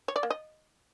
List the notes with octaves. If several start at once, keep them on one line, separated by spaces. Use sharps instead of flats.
C#5
D5
A#3
D#5